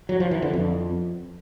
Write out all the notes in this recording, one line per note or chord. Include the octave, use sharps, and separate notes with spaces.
F#3
F3
E3
D3
F2